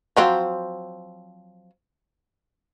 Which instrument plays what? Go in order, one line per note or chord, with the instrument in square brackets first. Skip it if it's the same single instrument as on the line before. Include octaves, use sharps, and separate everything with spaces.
[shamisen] F3 F#3 C4